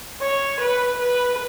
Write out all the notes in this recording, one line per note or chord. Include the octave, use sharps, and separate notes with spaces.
C#5
B4
B4